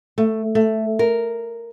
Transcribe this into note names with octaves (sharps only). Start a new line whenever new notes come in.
A3
A3
A#4